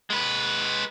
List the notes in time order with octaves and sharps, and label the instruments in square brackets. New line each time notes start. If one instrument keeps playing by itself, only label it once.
[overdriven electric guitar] G#3 B4